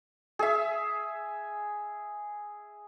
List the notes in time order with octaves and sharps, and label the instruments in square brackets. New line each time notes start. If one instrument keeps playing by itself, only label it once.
[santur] G#4 E5